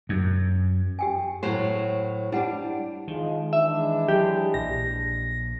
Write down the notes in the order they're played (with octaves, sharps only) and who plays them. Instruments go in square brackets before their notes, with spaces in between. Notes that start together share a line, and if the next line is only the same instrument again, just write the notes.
[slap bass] F#2
[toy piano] G4 G5 G#5
[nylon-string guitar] A2 F#3 C5
[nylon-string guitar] G3 D4 [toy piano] E4 F#5 B5
[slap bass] D#3 [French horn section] F3 G#3
[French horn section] E3 G#3 D4 [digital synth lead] E5
[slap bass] F#3 [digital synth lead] G4
[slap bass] A#1 [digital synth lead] A#6